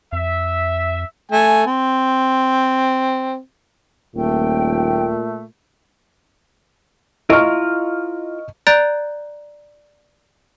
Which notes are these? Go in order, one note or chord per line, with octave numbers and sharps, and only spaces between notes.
F2 E5
A3 G#5
C4
D#1 A#2 A3 G5
E4 F4 A#4 D#5 C#6 F6
D5 A#5 F#6 G6 A6 D7